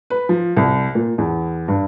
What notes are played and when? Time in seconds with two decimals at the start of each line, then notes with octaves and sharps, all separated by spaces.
0.10 B4
0.29 F3
0.57 C2
0.95 A#2
1.18 E2
1.68 G2